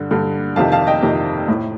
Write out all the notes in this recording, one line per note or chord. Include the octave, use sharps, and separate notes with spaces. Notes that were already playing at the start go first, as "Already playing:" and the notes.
Already playing: G2 D3
G2 D3
F2 C3 D#3 F5 A5
F5 A5
D#5 G5
F2 C3 D#3
A2